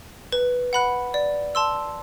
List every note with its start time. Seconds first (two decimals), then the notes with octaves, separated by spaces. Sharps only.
0.32 B4
0.73 F#5 B5 F#6
1.14 D5
1.55 A5 C6 E6